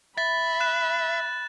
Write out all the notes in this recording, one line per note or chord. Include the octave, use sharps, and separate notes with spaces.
E5 B5 A6
F#6 E7